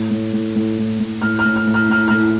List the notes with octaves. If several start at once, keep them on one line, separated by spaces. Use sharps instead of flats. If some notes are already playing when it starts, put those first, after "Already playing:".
Already playing: A2
A2
A2
A2
A2
A2
A2 F6
F6
A2
F6
A2
F6
A2 F6
A2 F6